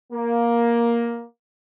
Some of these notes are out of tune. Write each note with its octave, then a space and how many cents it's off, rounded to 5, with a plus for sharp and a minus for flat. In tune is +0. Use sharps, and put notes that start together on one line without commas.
A#3 +10